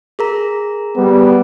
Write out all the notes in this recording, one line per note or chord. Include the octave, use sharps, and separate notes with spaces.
G#4 A#4 A#5
G3 B3